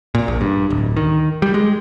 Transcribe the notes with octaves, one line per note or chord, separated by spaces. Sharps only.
A#2
A#1
G2
D1
D#3
G3
G#3